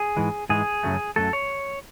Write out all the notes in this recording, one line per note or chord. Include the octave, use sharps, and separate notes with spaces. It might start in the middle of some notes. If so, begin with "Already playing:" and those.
Already playing: G#4
G#2 E3 G#3
G#2 E3 G#3 G#4
F#2 C#3 F#3 A3
F#2 C#3 F#3 A3 A4
C#5